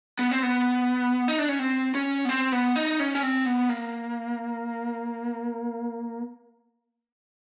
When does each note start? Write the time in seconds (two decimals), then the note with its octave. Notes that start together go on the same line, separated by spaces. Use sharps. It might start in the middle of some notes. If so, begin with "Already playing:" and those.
0.19 B3
0.31 C4
0.43 B3
1.28 D#4
1.39 D4
1.49 C#4
1.59 C4
1.95 C#4
2.25 B3
2.29 C4
2.52 B3
2.76 D#4
3.00 C#4
3.15 C#4
3.23 C4
3.46 B3
3.69 A#3